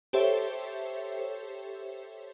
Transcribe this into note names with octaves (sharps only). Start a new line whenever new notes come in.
G4 A4 C5 C#5 E5